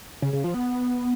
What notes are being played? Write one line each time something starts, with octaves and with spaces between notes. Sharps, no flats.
C#3
C#3
F3
B3